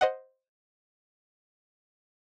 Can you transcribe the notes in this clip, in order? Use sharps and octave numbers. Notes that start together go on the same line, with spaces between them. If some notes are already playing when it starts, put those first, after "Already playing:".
C5 D#5 F#5